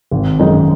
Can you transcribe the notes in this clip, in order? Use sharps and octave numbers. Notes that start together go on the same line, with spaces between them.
G#1
F#2 D#3 G#3 D#4